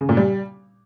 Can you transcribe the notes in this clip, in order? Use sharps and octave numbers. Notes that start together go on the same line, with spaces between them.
C#3
A#2
G3